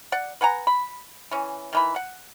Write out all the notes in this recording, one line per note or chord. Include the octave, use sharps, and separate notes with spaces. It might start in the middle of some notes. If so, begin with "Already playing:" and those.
D5 F#5
B4 F#5 G#5 A#5
B5
E3 C#4
D#3 E3 B5
F#5